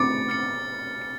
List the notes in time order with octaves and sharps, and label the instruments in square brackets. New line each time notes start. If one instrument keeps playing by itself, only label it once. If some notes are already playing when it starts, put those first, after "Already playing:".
Already playing: [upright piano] D6 [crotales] A6 C#7
[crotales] F6 A6 C#7
C#7